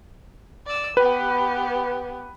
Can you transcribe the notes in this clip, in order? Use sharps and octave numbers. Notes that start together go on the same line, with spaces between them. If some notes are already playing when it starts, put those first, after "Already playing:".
D5 E6
B3 G4 B4